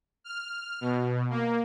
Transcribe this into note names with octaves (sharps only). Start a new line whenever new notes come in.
F6
B2
A#3